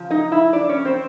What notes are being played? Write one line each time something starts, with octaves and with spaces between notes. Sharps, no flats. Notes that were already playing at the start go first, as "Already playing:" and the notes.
Already playing: C#3 F3
D#4 D#5
E4 E5
D4 D5
C#4 C#5
C4 C5